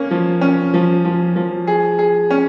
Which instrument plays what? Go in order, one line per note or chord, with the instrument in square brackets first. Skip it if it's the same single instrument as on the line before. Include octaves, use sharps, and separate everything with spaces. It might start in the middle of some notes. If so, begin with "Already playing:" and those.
Already playing: [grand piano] A#3 C#4
F3
C#4
F3
F3
F3
G#4
G#4
C#4